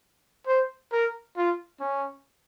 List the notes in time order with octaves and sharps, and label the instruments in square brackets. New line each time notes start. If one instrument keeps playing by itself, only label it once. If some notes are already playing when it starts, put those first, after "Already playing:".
[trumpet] C5
A#4
F4
C#4